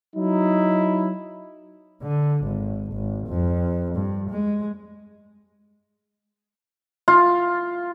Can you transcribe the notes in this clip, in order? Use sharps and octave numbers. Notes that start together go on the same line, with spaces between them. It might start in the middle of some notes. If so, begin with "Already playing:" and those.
F#3 D#4 E4
D3
G#1
G#1
F2
G2
G#3
F4